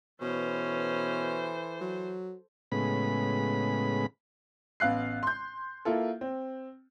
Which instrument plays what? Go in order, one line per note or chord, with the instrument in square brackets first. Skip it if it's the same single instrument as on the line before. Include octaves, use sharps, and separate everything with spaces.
[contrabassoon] B2 [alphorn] E3 [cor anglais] C#4 [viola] A4 C5
[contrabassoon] F#3
[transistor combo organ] A2 C#3 G#3 B3 B5
[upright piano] A1 B3 F5 F#6 C7
C6 G6
A#3 E4 F4 A4
C4